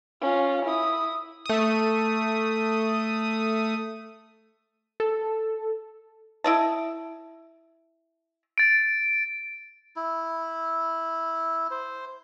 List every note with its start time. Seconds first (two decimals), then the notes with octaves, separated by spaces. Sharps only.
0.21 C#4 F4
0.65 E4 D#6
1.46 A3 D#6
5.00 A4
6.44 E4 D#5 A5
8.58 A6 D7
9.96 E4
11.71 C5